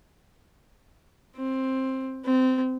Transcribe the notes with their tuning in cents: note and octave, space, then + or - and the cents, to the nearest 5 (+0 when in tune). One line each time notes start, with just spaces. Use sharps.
C4 +10
C4 -20